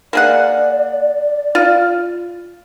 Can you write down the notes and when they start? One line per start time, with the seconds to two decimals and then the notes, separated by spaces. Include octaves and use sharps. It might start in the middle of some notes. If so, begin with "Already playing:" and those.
0.13 A#3 G#4 D5 F#5
1.55 F4